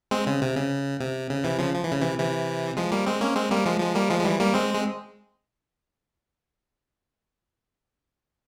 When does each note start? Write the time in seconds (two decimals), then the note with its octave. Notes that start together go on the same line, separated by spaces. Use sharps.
0.11 G#3 C4
0.27 C#3
0.42 C3
0.56 C#3
1.00 C3
1.30 C#3
1.44 C3 E3
1.59 C#3 F3
1.73 F3
1.84 E3
1.92 C#3
2.01 C3 E3
2.19 C3 E3
2.77 F3 G#3
2.92 G3 A#3
3.06 G#3 C4
3.21 A#3 C#4
3.36 G#3 C4
3.51 G3 A#3
3.66 F3 G#3
3.80 F3 G#3
3.95 G3 A#3
4.10 F3 G#3
4.20 G#3
4.24 E3 G3
4.39 G3 A#3
4.54 G#3 C4
4.74 G#3